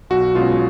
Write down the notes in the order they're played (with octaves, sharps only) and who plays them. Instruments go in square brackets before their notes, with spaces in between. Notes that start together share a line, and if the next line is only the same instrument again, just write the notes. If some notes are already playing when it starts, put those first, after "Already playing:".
[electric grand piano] B1 F#4
B2 G#3 C#4 F4